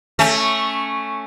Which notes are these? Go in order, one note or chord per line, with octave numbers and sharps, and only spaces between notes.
A3 C#4